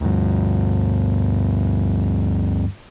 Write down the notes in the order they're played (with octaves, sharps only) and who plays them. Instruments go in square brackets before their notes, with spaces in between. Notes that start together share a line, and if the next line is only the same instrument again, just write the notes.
[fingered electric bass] D2 G2